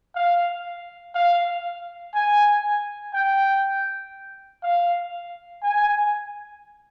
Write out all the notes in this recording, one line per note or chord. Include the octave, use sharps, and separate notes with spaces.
F5
F5
G#5
G5
F5
G#5